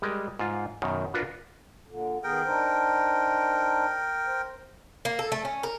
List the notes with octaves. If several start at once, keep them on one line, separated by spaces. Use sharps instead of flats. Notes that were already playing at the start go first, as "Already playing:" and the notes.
G3 G#3 A#4 D#5
G#2 F4
F#2 B2 D#3
D4 F4 F#4 A#4 B4
A#2 D3
D#3 B3 G#4 A#4 G5
D4 D#4 C5
C5
A#3
A4
A3
C#4
A#4